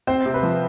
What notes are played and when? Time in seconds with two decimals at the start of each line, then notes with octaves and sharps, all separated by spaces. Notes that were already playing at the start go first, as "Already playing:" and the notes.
0.07 C4 C5
0.26 C3
0.34 B4
0.43 F3